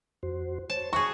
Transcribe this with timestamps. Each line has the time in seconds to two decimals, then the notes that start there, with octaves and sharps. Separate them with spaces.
0.23 F2 F#4 C5
0.70 C5 C#5 A5
0.93 F#4 G#4 A5 C#6